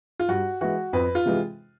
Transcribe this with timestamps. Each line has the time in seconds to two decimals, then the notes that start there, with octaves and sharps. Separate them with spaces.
0.19 F4
0.28 G2 F#4
0.61 E3 G#3 F#4
0.93 F2 B4
1.15 F4
1.26 C3 E3 G#3